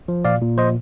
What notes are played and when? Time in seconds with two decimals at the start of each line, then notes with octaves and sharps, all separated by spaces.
0.08 F3
0.25 A#2 D5 F5
0.41 A#2
0.58 F3 C5 D#5